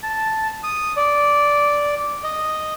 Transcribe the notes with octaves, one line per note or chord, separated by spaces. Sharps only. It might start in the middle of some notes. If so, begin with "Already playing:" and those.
A5
D#6
D5
D#5